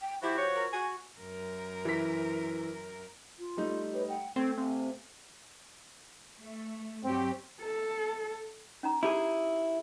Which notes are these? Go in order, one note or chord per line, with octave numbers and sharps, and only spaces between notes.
G5
F3 E4 F#4 G4
C#5
A#4
F#4 G#5
F#2 A#4
E3 B6
F4
G3 A3 D#4
G4 B4 C#5
F#5 G5
A3 C4 G#6
C3 F5 G#5
A3
G2 F#3 C4 G4
A4
C#4 D#4 A#5
E4 G4 G#4